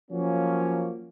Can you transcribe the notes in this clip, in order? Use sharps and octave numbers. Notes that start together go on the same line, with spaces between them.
F3 F#3 A#3 C#4